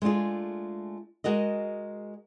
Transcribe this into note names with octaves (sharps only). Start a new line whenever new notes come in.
G#3 A3 D4 F4 G#4
G#3 F#4 A#4 D#5